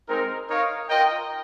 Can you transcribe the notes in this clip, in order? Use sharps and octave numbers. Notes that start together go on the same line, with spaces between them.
G#3 C4 D#4 A#4
D#4 A#4 C#5 F5
F4 A#4 D#5 G5